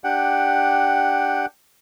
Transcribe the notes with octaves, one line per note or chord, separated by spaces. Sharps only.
D4 G4 F#5 G5